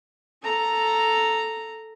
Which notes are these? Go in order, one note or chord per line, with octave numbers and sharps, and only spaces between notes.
A4 A#5